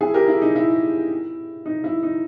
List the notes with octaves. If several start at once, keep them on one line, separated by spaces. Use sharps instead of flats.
E4 G#4
G4 A#4
E4
D#4
E4
D#4
E4
D#4